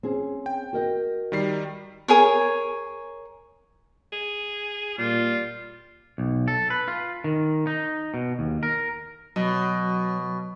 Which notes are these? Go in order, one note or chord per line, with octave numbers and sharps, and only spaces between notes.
C4 C#4 G#4
G5
F#4 A#4 D#5
D#3 G3 C7
G#4 A#4 C#5
G#4
A#2 G3 F4
B1
A4
B4
F4
D#3
D#4
B2
D#2
A#4
B2 F#3